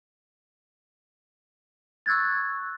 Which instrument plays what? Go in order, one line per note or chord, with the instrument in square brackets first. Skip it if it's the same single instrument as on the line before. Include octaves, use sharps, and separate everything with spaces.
[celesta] C#6 E6 F#6 G#6 A6